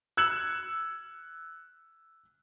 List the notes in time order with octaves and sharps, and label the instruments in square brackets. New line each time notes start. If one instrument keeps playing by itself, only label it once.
[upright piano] E6 F#6 G#6 C#7 E7 F#7